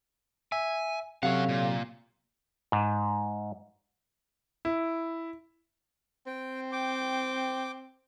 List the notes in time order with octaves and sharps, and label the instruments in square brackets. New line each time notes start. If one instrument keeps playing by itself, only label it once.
[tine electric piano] E5 [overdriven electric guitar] G#5
[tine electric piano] C3 F#3 [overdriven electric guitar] C#4 F#5 [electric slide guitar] A4 C#5 F5
[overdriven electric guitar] A#2
[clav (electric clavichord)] G#2
[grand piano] E4
[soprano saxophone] C4 [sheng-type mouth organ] G5
[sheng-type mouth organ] G5 D6